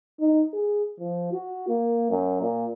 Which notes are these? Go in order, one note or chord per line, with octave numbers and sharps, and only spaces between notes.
D#4
G#4
F3
F#4
A#3
F#2
A#2